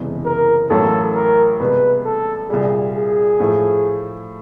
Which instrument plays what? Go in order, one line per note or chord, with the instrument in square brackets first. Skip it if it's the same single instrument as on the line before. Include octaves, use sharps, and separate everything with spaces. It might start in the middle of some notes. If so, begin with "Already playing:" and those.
Already playing: [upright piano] F#1 E2 C3 E3 G#3
[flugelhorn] A#4
[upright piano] A1 A2 F#3 A#3 [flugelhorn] A4
[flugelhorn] A#4
[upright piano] C2 B2 G#3 [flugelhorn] B4
[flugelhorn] A4
[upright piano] C2 A#2 G3 [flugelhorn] G#4
[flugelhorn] G#4
[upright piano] A2 F3 A3